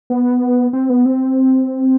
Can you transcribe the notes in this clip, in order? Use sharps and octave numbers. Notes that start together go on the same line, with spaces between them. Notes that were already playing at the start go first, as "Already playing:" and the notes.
B3
C4
B3
C4